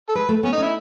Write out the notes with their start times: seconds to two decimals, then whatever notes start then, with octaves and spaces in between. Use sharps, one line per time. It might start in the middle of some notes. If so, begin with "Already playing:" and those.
0.09 A4
0.15 G#3 B4
0.29 A3
0.43 B3 C#4
0.53 D#4
0.58 C#4
0.63 E4